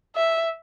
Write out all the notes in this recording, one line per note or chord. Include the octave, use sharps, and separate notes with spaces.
E5